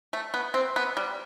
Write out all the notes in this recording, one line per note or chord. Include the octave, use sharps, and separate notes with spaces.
A3
B3
C4
B3
G3